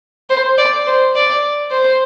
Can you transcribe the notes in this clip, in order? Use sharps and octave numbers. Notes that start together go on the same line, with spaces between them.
C5
D5
C5
D5
C5